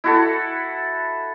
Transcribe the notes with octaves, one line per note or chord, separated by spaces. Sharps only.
E4 F#4 A4